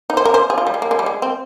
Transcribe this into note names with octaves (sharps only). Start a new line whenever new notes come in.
D#4
C5
A#4
C5
G#4
F4
G3
G#3
A#3
G#3
G3
G#3
C4